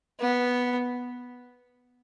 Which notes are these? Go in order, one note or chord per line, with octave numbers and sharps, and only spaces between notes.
B3